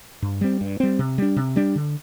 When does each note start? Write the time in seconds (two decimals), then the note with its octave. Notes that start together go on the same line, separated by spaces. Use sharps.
0.22 G2
0.41 G3 C4
0.61 G2
0.80 G3 C4
0.99 C3
1.18 G3 D4
1.36 C3
1.56 G3 D4
1.76 D3